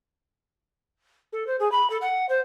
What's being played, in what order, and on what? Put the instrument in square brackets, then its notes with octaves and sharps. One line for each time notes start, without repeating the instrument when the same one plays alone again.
[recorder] A4
C5
G#4
B5
A4
F#5
C5